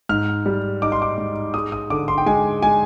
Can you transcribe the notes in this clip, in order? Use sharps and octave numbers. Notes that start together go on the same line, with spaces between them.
G#2 F6
G3
D#4 D6
C6
D6
G#2
G#3 D#6
D#6
D3 D6
C6
G5
G#3 G#5
G#3 G#5